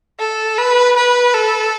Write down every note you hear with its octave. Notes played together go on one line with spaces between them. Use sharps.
A4
B4
B4
A4